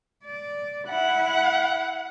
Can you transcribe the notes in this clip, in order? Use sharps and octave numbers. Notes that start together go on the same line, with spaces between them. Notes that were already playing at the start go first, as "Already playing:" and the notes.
D5
E4 F#5